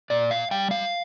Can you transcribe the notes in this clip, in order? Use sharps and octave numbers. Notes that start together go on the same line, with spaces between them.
A#2 D5
F5
G3 G5
F5